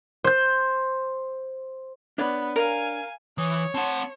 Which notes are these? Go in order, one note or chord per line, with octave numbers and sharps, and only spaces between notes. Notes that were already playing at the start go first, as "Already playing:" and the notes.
C5 G6
B3 D4 C#5 D5
A#4 F5 G#5
E3 C#5 D#6
C4 F#5 A5 C6 E7